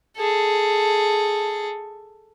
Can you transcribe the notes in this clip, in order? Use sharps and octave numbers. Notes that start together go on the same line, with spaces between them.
G#4 A4